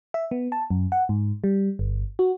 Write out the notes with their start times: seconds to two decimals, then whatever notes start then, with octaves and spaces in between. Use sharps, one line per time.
0.14 E5
0.31 B3
0.52 A5
0.71 F#2
0.92 F#5
1.09 G#2
1.44 G3
1.79 G1
2.19 F#4